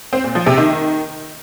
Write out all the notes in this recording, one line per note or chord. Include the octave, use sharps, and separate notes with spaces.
C4
A#2
F3
C3
D#3